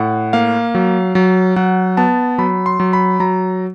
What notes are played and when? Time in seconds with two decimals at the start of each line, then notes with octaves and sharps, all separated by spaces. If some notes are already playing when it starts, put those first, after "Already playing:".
Already playing: A2 F#5
0.33 A#3 F5
0.75 F#3
1.15 F#3
1.56 F#3 F#5
1.97 B3 A5
2.38 F#3 B5
2.66 C6
2.80 F#3
2.93 B5
3.20 F#3 A#5